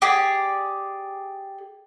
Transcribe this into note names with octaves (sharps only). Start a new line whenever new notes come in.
G4 G#4 D5